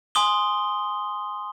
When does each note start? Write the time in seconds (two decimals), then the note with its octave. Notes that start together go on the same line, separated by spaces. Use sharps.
0.15 G#5 C6 D#6 G7